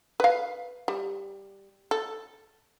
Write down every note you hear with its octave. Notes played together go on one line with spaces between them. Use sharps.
B4 F5
G3
A4